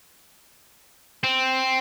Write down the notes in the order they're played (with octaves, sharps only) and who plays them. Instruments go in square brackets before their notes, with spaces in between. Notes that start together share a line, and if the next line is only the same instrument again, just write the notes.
[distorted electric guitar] C4